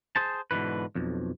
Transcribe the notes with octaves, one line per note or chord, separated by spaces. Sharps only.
G#4 C5 A5
G#2 B2 D3 E3 B4
B1 F2